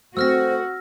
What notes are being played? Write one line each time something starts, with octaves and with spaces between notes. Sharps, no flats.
A3 C4 F#4 C5 E6 F6 A#6